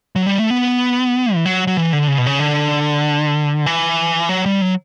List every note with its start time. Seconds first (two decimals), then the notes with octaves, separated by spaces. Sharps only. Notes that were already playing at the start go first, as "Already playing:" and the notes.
0.16 F#3
0.27 G3
0.38 A3
0.50 B3
1.34 E3
1.46 F#3
1.67 F#3
1.77 E3
1.93 D3
2.08 C#3
2.18 B2
2.26 C#3
2.39 D3
3.66 E3
4.29 F#3
4.46 G3
4.61 F#3